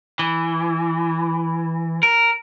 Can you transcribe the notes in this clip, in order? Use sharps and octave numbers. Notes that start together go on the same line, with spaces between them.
E3
A#4